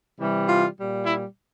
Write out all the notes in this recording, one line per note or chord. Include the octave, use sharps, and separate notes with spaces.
C3 E3 G3
F4
A#2 G3
E4